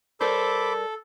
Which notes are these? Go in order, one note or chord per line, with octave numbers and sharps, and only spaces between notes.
G3 A4 A#4 C5 C#5 B5 D6